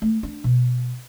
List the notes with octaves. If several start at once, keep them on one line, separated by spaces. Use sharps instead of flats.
A3
D4
B2